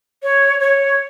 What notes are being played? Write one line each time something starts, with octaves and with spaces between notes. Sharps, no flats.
C#5
C#5